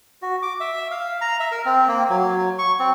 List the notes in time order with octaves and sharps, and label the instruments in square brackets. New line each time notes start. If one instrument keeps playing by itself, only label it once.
[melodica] F#4
D6
E5
F5
A#5
E5
A#4
C4
A#3
F#3
C#6
C4